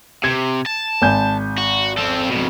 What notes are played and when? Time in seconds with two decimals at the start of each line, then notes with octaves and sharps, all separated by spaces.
0.24 C3 G#6
0.66 A5
1.02 G#1 G#5 G6
1.58 F#4
1.98 C4 A4
2.30 F2 B2